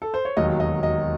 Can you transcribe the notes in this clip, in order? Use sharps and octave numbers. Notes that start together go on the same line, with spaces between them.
A4
C5
C#5
E1 D#2 D#3 F#3 D#5
D#5
D#5